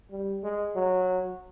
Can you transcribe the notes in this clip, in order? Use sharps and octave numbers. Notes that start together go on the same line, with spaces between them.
G3
G#3
F#3